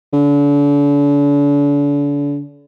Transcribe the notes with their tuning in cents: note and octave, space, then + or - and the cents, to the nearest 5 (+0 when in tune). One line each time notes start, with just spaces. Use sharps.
D3 -40